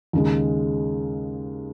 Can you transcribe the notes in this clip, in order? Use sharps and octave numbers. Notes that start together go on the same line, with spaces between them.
D#2 C#3 G#3